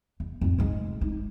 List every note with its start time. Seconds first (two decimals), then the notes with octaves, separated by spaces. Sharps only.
0.20 E2
0.41 F2 G#2
0.58 G#2 G#3
1.01 D#4 E4